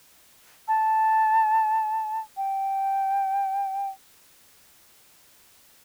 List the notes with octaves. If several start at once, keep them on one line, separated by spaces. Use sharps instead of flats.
A5
G5